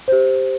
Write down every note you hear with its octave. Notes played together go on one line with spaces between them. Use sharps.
G4 C5